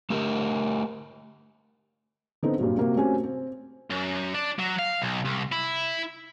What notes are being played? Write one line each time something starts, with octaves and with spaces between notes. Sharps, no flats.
A3 G4 A#4
D3 B3 C4 D#4 A4
G2 A#2 F#3
C3 A#3 F#4
A3 C4 C#4 F#4 G4 G#5
C4
F#2
D4
F#3
F5
B1
C2
E4